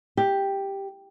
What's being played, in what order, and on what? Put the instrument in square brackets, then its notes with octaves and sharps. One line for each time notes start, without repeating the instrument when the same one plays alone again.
[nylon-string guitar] G4